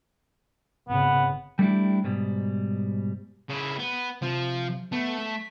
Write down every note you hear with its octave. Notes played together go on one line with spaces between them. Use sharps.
G#1 C#3 B3
G3 A3 D4 E4 G4
G#2 B2 G3
C#3 E4
B3
C3 F3
A3 B3
B6